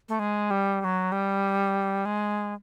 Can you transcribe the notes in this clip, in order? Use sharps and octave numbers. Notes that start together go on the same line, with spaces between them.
A3
G#3
G3
G3
F#3
G3
G#3